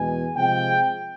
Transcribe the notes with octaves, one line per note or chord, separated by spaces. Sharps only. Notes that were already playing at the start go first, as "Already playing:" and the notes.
Already playing: E2 B2 G#3 G#5
C3 F3 G#3 G5